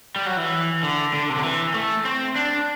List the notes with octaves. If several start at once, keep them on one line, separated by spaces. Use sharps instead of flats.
G3
F#3
E3
D3
D3
C3
D3
E3
A3
C4
D4